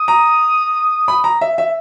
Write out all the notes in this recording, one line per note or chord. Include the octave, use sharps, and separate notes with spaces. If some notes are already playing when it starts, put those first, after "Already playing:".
Already playing: D#6
A#5
B5
A#5
E5
E5